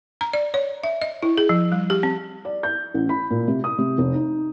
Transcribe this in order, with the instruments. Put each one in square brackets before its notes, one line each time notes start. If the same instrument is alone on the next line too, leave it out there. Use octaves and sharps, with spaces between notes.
[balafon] A#5
D5
C#5
E5
D#5
E4
G#4
F3
G3
G4
C4
[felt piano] D5
G6
A1
B5
A#2
C3
D#6
C3
F1
D#4